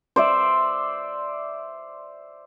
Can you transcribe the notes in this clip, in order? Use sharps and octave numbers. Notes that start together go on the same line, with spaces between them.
C5 D5 E5